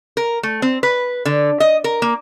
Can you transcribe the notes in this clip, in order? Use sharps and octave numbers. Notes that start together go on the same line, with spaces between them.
A#4
A3
C4
B4
D3
D#5
A#4
A#3